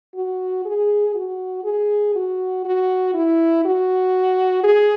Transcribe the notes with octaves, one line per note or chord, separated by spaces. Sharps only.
F#4
G#4
F#4
G#4
F#4
F#4
E4
F#4
G#4